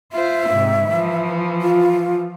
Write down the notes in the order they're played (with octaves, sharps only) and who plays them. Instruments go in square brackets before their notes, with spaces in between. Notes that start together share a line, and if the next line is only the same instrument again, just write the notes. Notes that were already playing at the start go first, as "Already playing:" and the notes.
[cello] F4 C5 [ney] E5
[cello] G#2 C3
E3 F3
[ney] F4